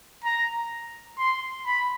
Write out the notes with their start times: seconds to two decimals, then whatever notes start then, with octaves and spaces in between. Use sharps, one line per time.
0.24 A#5
1.18 C6
1.66 B5